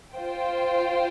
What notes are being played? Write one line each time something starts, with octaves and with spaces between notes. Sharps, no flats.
F4 C5 G5